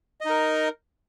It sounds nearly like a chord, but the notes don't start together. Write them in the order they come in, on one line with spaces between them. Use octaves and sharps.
D#5 D#4 A#4